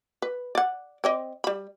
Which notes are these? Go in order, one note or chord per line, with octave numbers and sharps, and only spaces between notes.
B4
D5 F#5
C4 D5 D#5
G3 B5